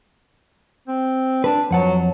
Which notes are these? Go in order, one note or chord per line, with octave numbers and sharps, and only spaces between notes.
C4
D4 B4
F2 F#3 F#5 A5